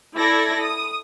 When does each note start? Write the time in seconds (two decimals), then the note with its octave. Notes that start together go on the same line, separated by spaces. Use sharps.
0.15 E4 A4 D5 G#6 A#6
0.61 D#6